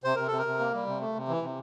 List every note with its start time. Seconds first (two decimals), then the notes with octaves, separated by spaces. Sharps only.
0.04 C3 C5
0.16 C3 A#4
0.27 C3 A4
0.38 A#4
0.46 C3
0.59 A#3
0.74 G3
0.87 C3
1.01 A3
1.15 C3
1.28 E3
1.42 C3